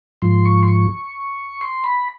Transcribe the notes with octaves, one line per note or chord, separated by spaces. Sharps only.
G#2 F3 C6
C#6
C6
C#6
C6
B5